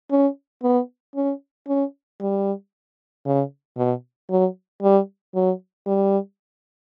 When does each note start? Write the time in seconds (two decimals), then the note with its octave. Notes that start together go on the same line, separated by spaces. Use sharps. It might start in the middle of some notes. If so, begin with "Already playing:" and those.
0.11 C#4
0.63 B3
1.15 C#4
1.68 C#4
2.21 G3
3.26 C#3
3.77 B2
4.30 F#3
4.82 G3
5.35 F#3
5.86 G3